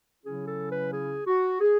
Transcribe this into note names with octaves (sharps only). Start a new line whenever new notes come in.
C#3 F#3 C#4 E4 G#4
A4
B4
G#4
F#4
G#4